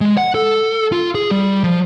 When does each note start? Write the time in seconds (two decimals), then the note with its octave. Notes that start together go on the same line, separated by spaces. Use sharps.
0.01 G#3
0.17 F#5
0.34 A4
0.92 F4
1.15 G#4
1.31 G3
1.64 F3